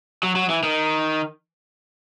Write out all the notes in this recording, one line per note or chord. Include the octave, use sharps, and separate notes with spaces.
F#3
F#3
E3
D#3